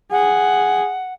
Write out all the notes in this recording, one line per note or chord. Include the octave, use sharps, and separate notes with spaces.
G#4 F#5